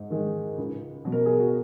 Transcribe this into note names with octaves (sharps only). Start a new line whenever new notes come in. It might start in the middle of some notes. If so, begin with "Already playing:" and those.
Already playing: G#2 D#4
D#3 G#3
C#2
B2 F#3
A#4
G#4
F#4